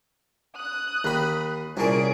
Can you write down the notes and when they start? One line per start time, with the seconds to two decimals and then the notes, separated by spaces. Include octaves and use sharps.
0.57 D#6 F#6
1.04 D#2 B5
1.77 C2 A#2 C#4 G#4 A5 D7